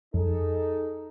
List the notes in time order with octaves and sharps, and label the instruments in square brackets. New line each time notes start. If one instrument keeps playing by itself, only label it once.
[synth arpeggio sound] F2 [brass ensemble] D#4 G#4 A4